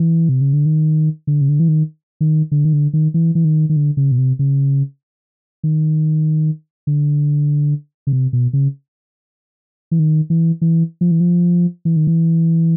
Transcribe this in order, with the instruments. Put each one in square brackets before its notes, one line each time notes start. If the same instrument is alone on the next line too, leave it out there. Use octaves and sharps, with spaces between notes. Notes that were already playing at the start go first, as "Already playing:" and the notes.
Already playing: [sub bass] E3
C3
C#3
D3
D#3
D3
C#3
D3
E3
D#3
D#3
D3
D#3
D3
D#3
E3
E3
D#3
D#3
D3
C#3
B2
C3
C#3
D#3
D3
C#3
C3
B2
C#3
E3
D#3
E3
E3
F3
E3
F3
E3
D#3
E3